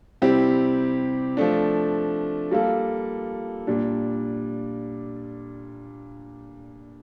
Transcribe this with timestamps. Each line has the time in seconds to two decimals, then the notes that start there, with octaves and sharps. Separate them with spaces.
0.22 C3 G3 C4 E4 G4
1.37 F3 A3 D4
2.51 G3 A#3 F4 A4
3.67 A#2 G3 D4